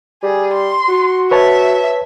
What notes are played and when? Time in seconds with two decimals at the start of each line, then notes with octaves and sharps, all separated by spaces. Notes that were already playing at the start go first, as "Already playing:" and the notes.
0.23 G3 G#4
0.54 C6
0.89 F#4
1.31 B4 C#5 E5 A5